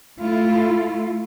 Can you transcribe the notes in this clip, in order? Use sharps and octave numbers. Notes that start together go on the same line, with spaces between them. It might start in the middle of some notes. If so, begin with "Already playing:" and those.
A3 E4 F4